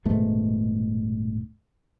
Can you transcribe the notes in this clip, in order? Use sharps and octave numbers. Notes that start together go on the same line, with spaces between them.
D#1 G#2 B2 A3